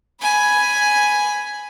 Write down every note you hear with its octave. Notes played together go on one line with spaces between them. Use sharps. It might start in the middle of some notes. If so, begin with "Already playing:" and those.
G#5 B5